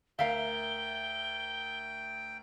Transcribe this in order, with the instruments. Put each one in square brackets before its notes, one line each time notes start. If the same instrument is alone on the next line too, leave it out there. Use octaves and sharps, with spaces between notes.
[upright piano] D2 A#4 [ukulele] E5 F5 [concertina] G5 [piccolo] G7